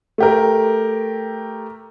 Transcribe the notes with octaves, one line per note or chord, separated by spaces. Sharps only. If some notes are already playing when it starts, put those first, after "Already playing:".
A3 G4 A#4